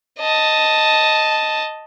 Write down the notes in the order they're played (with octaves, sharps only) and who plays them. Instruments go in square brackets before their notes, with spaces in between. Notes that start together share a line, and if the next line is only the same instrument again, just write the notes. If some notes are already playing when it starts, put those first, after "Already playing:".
[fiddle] D#5 A5